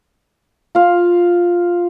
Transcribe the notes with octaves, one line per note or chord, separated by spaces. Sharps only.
F4 F5